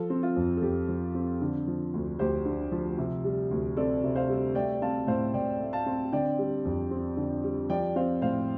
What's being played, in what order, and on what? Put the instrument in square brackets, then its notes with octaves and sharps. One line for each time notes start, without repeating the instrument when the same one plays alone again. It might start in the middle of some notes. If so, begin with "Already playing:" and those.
Already playing: [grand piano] F3 F4 A4
C4
F4
F2
A4
F2 G4
F3
C4
D3
F3
D2
D2 G4 C5
D3
F3
C3
G3
D2
C4 A4 D5
C3
C5 F5
G3
A3 D5 G5
C4 F5 A5
A2 C5 F5
A2 D5 G5
A3
F5 A5
C4
D3 D5 G5
G3
F2
C4
D3
G3
F3 D5 G5
C4 C5 F5
A2 C5 F5